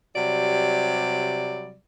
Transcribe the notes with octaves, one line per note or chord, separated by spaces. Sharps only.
C3 F#3 G3 D5